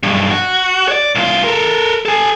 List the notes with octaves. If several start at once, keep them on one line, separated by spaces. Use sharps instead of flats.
B1 G2
F#4
C#5 D5
C2 F4
A4 A#4
A4 G#5